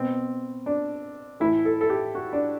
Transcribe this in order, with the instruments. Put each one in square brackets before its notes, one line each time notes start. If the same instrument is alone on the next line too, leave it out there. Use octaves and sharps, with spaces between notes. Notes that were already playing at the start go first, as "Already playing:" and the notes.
Already playing: [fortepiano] B2 C4
D4
A2 E3 E4
A4
A4
G4
F#4
D4